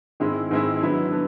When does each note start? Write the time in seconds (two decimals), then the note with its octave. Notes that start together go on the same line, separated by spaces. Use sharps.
0.20 G#2 D#3 G#3 C4 E4
0.51 G#2 D#3 G#3 C4 E4
0.80 D3 F#3 B3 E4
1.12 D3 F#3 B3